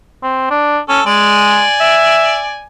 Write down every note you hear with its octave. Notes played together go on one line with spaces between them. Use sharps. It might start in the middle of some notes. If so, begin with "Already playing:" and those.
C4
D4
C#4 A4
G#3 D5 G#5
E5